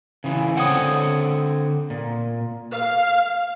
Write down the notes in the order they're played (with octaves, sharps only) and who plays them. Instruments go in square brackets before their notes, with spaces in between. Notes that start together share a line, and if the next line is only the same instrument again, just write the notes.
[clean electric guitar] C#3 E3
[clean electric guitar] D3 C4 C#5 [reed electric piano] F#5 D#6
[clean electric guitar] A#2
[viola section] F5